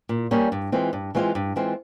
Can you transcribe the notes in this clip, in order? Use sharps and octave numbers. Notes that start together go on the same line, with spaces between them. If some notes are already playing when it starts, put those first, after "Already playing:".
A#2
G3 A#3 C#4
G2
E3 G#3 C4 F4
G2
E3 G#3 C4 F4
G2
E3 G#3 C4 F4